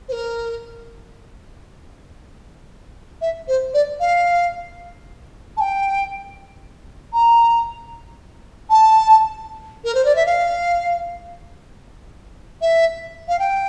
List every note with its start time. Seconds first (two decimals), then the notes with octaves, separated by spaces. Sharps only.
0.08 C5
0.12 A#4
3.21 E5
3.48 C5
3.74 D5
4.00 F5
5.57 A5
5.60 G5
7.13 A#5
8.70 A5
9.84 A#4
9.94 C5
10.05 D5
10.15 E5
10.26 F5
12.61 E5
13.28 F5
13.39 G5